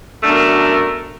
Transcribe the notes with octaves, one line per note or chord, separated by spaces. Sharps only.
F#2 B2 A3 D4 A#4